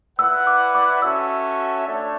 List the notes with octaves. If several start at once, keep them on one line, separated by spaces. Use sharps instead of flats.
E4 B4 D5 F#5 E6
D6
D6
C#4 F#4 A4 E5 E6
A3 D4 A4 C#5 E5